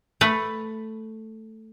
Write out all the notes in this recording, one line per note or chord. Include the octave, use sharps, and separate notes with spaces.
A3 B4